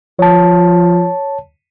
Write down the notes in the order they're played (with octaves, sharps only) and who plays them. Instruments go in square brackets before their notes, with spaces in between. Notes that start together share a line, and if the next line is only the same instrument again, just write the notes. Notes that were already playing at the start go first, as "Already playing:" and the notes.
[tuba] F3 [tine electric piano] C#5 A5